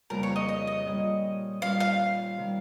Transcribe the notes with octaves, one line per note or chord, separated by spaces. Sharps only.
F2 C#3 G3 A#3 A#4
C#5
D#5
D#5
D#5
A#2 G3 C#4
D#3 G3 C#4 F4 F5
F5
C3 D#3 G3